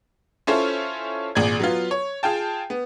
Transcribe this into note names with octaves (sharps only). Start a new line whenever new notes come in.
C#4 E4 F4 A4 C5 C#5
G#1 A#2 G#4 D5 G#6
F#3 B3 F4
C#5
F4 G#4 G5 A5
B3